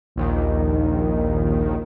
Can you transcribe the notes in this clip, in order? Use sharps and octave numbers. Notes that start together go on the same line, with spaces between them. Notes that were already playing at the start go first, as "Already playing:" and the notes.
A#1 D#2 D#3